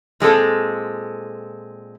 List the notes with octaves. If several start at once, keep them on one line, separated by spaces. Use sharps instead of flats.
A#2 G#3 C4 A4